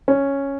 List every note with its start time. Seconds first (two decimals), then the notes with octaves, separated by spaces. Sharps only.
0.08 C#4